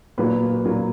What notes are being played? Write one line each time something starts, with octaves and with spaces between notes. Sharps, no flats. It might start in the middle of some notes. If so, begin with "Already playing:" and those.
A#2 F#3 A#3 B4
A#2 F#3 A#3